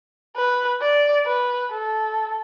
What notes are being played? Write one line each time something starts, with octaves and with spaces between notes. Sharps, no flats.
B4
D5
B4
A4